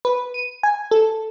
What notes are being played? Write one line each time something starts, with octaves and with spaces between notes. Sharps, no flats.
B4
D#7
G#5
A4